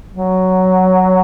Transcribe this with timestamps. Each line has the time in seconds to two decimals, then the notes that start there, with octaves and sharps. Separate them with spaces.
0.13 F#3